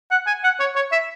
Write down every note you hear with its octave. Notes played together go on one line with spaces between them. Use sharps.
F#5
G#5
F#5
C#5
C#5
E5